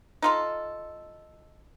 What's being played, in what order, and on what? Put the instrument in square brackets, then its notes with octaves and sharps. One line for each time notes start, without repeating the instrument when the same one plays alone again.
[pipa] D#4 F4 A4